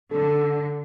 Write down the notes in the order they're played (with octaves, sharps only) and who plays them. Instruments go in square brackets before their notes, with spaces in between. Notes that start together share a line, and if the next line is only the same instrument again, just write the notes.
[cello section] D3 [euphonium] A4